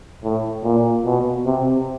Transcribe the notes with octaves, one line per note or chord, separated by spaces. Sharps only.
A2
A#2
B2
C3